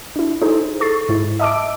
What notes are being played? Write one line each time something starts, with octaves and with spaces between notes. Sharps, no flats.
D4 E4
D#4 E4 G#4 A4 C5
A4 C#6 A6 C7
G#2 E4
D#5 E5 A5 D6 E6 D7